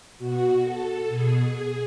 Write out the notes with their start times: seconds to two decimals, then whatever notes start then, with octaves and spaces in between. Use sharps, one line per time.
0.19 B2 F#4
0.64 A4
1.09 B2 G#4